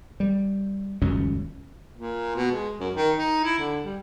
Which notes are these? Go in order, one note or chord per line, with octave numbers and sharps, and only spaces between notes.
G3
D#1 C#2 F#2 C#4
A#2
B2
G#3
F#2
D#3
D#4
E4
D3
G3